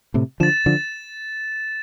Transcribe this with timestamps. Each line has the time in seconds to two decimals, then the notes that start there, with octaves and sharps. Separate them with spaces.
0.14 A2 C3
0.40 D3 F3 A6 E7
0.66 D3 F3